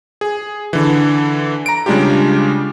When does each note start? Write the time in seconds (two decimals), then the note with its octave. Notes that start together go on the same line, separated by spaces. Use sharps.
0.21 G#4
0.73 D3 E3
1.66 A#5 D7
1.86 C#3 G3 G#3 D4 F4 G4